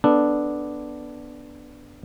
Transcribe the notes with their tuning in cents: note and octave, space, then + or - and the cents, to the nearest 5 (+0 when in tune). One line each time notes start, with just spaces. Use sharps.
B3 +0 D4 +0 A4 +0